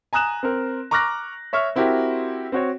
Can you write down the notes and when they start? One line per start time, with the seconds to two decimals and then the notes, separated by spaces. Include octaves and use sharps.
0.13 G#5 A#5 D#6 F#6 E7
0.43 C4 A#4
0.91 A#5 C#6 D6 F6 F#6 A#6
1.53 C#5 E5 C#6 F6
1.76 C4 E4 F#4 G4 A#4
2.52 C4 F#4 C#5